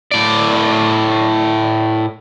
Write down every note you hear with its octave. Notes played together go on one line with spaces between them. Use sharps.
A2 D5